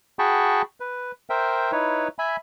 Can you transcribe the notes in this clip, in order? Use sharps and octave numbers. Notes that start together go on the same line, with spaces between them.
F#4 G#4 G5 A5 B5 C#6
B4
A#4 C5 E5 G5
D#4 E4 B4 C#5
E5 G#5 B5